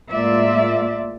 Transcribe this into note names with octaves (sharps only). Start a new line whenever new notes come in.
A2 G#3 A#3 F4 D5 E5